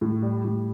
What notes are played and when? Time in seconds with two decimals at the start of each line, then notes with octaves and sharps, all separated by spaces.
0.01 A2
0.22 G3
0.44 A2